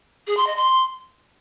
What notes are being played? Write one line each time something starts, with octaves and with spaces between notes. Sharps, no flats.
G#4
C6
D#5
C6